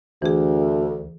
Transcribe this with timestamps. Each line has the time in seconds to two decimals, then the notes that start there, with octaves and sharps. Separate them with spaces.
0.22 D2 E3 G#4